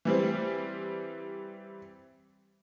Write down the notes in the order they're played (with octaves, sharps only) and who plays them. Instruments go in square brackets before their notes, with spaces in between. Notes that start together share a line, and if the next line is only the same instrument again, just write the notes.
[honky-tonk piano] E3 G3 C4